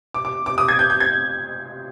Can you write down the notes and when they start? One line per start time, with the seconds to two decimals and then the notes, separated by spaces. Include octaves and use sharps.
0.14 D6
0.25 D6
0.46 D6
0.58 D#6
0.68 G#6
0.79 G6
0.90 G6
1.00 G#6